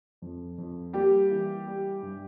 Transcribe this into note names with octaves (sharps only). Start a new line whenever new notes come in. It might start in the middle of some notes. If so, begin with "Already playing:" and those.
F2
F2
G3 A#3 G4
E3
G3
G2